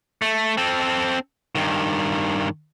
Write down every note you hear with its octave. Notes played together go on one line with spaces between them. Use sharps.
A3
C4 A4
G2 D#3